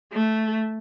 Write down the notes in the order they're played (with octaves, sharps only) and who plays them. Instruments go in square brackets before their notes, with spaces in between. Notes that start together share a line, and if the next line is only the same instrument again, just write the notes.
[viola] A3